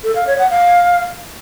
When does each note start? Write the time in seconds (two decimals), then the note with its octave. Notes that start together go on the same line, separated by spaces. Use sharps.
0.04 A4
0.15 F5
0.27 C#5
0.39 F#5
0.50 F5